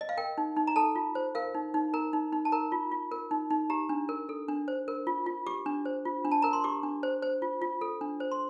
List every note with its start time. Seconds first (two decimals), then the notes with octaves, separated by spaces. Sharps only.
0.01 D#5
0.09 F5
0.17 A#4 G5
0.38 D#4
0.56 D#4
0.67 A#5
0.76 A4 A5
0.96 F4
1.15 C5
1.35 A#4 F5
1.55 D#4
1.74 D#4
1.94 A#4 A#5
2.13 D#4
2.33 D#4
2.45 A5
2.52 A#4 A#5
2.72 F4
2.92 F4
3.12 A#4
3.31 D#4
3.50 D#4
3.70 G4 A#5
3.89 D4
4.09 A#4
4.29 A4
4.48 D4
4.68 C5
4.88 A#4
5.07 F4
5.26 F4
5.46 G4 D6
5.66 D4
5.85 C5
6.05 F4
6.25 D4
6.32 A5
6.42 A#4 A#5
6.53 C6
6.64 G4 D6
6.83 D4
7.03 C5
7.22 C5
7.42 F4
7.62 F4
7.81 A4
8.01 D4
8.20 C5
8.32 C6